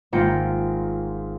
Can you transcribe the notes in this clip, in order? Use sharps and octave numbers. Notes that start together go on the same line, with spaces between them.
G#1 A#3 F4 F#5 G5 C#7